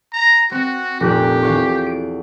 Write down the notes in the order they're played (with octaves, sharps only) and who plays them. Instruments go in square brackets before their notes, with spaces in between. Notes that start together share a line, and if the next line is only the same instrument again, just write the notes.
[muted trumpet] A#5
[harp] C4 [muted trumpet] F#4
[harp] F1 A#1 F#6 [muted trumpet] G4
[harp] E2 F5 C#6
D7